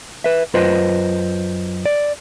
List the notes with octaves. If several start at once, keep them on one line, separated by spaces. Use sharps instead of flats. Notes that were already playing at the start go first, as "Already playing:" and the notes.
B4 E5
F#2 F4 B4 C5 D#5
D5